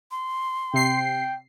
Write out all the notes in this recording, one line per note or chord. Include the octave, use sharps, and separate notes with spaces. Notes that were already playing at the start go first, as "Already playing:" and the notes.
C6
C3 G5 C7